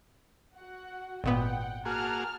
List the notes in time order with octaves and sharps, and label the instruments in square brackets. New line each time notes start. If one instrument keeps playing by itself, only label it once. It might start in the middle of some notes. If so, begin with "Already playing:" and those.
[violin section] F#4 F#5
[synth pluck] G#1 A#2 B3 [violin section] F#5 G5
[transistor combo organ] A#3 F#4 G#4 [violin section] A5 F6